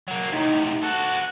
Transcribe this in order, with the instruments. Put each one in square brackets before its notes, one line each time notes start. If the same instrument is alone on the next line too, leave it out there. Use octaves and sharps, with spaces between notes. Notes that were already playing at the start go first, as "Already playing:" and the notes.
[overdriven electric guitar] F#3 A#3
[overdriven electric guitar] A2 C3 [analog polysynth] D#4
[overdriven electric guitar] F#4 A4 [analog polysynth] F#6